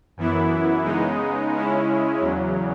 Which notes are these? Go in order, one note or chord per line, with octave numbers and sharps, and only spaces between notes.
F#2 E3 B3 E4
C#3 G#3 B3 D#4
C#3 G#3 C#4 E4
E2 C#3 F#3